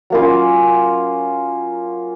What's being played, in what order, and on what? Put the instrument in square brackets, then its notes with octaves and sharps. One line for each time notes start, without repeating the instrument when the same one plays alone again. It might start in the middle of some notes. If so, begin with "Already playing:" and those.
[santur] F#3 A#3 C#4 F4